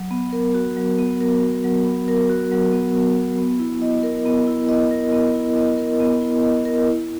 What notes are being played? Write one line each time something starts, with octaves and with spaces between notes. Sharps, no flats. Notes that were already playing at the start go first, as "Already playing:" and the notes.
Already playing: F#3
B3
A#4
F#4
F#3
B3
A#4
F#4
F#3
B3
A#4
F#4
F#3
B3
A#4
F#4
B3
E4
D#5
A#4
B3
E4
D#5
A#4
B3
E4
D#5
A#4
B3
E4
D#5
A#4
E4